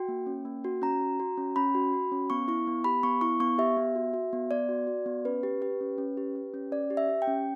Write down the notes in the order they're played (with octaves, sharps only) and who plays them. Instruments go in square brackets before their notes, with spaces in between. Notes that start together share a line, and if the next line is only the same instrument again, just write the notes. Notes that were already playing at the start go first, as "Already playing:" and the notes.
Already playing: [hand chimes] F#4 G5
A#3
C#4
A#3
F#4
C#4 A#5
F#4
F#4
C#4
C#4 B5
F#4
F#4
C#4
B3 C#6
E4 C#6
B3
G4 B5
B3 C#6
E4 C#6
B3 C#6
G4 E5
B3
F#4
F#4
B3
B3 D5
F#4
F#4
B3
C#4 B4
G4
G4
C#4
C#4
G4
G4
C#4
C#4 D5
G4
E5
G4
G5
C#4